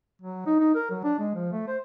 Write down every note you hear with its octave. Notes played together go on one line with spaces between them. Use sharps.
F#3
D#4
D#4
A#4
F#3
D4
G#3
F3
A3
C5